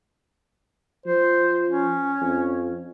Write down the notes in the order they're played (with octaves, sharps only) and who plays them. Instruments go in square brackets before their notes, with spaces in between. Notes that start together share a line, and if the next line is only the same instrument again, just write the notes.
[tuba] F3 [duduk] C5
[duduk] C#4
[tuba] F2